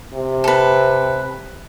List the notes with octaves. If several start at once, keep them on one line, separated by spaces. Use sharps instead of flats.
C3
A4 B4